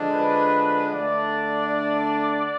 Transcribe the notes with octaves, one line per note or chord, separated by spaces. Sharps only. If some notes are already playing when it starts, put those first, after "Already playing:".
Already playing: D3 F3 G#3 D4
B4
D3 A3 D4 D5